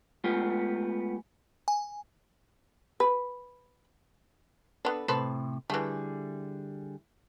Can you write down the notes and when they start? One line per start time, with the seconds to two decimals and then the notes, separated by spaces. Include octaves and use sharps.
0.24 G#3 A3 B3 F4 G4
1.68 G#5
3.00 B4
4.85 B3 D4 A4 B4
5.08 A2 C3 A4 B4 C5
5.70 D3 E3 G3 A3 G#4